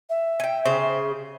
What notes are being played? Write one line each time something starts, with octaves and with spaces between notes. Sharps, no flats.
E5
G5 G#5
C#3 G#4 C5